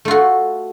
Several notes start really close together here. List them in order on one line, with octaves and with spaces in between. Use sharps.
A3 F4 F#4